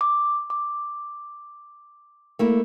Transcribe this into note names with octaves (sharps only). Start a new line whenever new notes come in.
D6
D6
A3 A#3 E4